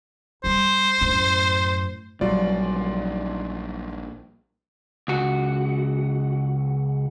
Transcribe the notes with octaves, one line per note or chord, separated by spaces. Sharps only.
G1 G3 C5
F#2 A2
A#1 F#3 G3 F4 D5
C#2 F#4